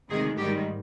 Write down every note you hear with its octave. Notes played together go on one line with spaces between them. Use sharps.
D2 C3 D#3 G#3 G#4
G#2 D#3 G3 G4